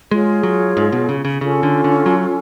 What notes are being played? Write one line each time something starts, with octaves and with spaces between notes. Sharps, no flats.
G#3 F4 G#4 C#5
F#3
G#2
B2
C#3
C#3
C#3 C#4 F4 A4
D3
D3
F#3